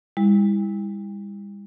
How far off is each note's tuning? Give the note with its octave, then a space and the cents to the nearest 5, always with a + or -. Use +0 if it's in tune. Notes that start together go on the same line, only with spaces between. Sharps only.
G3 +45 E4 -10